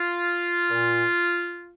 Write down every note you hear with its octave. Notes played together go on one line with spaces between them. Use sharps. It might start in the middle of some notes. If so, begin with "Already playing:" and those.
Already playing: F4
A#2